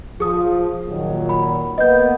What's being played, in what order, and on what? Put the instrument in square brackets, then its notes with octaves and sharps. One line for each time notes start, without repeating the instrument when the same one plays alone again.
[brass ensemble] F3 [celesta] G#4 D#6
[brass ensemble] A#2 D#3 F#3
[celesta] B5
[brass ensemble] A#3 B3 [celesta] D#5 G6